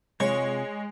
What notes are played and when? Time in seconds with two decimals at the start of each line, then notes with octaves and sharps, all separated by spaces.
0.20 C3 G#3 F4 C#5